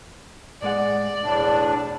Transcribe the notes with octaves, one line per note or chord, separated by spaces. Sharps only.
A2 G#3 D5 F#5
B1 E2 A2 D4